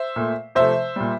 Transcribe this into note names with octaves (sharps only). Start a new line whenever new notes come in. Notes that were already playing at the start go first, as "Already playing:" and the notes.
Already playing: C5 E5
A#2 A3
C3 F3 A3 C5 E5
A#2 G3